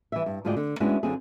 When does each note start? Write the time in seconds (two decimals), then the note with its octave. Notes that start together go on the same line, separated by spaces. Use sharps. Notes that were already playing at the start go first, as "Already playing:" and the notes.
0.12 E3 G3 E5
0.26 G2
0.45 D2 G#2 F4 G#4 D5 G5
0.56 D3
0.80 G#3 B3 C#4 D4 E4 F#4
1.03 F#2 D3 C4 F4 G#4